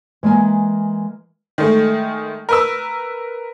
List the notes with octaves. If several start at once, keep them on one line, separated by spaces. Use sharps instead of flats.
E3 G#3 A#3 G#5
D#3 G#3 A3
A#4 B4 E6